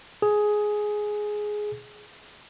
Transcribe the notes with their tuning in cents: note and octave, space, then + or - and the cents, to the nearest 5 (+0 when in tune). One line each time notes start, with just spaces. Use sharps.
G#4 +10